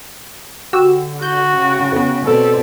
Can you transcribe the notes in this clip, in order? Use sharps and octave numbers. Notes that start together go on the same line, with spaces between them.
D3 F#4 G4 E6
F#4 G6
C#3 G5
F2 B3
B2 C4 A4 D5